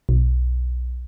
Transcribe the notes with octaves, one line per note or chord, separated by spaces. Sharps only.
B1